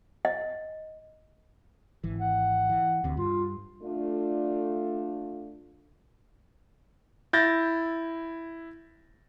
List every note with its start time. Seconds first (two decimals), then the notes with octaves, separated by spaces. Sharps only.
0.25 D#5
2.04 G#1 E3
2.20 F#5
2.70 E3
3.04 D2 C3
3.17 G2 F4
3.83 A3 D4 F4
7.33 E4 G6 A6 A#6